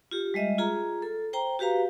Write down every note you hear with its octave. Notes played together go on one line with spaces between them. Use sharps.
F4 G4
G3 G#3 D#5 E5
F4 G#4 A#5
A4
C5 G5 A#5
F#4 G4 B4 F5 A#5